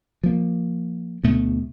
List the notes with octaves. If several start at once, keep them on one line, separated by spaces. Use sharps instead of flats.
F3 A#3
D2 B2 A3